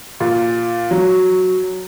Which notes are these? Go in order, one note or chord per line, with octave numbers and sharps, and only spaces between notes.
A#2
F#3